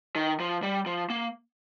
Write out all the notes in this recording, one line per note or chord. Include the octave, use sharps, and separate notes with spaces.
D#3
F3
G3
F3
A#3